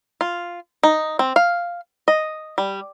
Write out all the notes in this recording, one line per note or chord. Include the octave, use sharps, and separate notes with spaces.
F4
D#4
C4
F5
D#5
G3